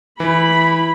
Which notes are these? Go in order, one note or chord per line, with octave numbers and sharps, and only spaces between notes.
E3 E4 B5